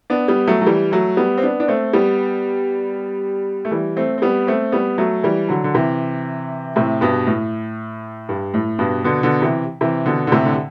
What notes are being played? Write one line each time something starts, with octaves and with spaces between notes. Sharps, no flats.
B3 D4
G3 B3
F#3 A3
F#3
E3 G3
F#3 A3
G3 B3
C4
B3 D4
D4
A3 C4
G3 B3
A3
E3 G3
A3 C4
C4
G3 B3
A3 C4
G3 B3
F#3 A3
E3 G3
D3 F#3
D3
C3 E3
A2 C3
G2 B2
A2
G2
A2
G2 B2
B2 D3
B2 D3
C3 E3
C3 E3
B2 D3
D3
A2 C3
D3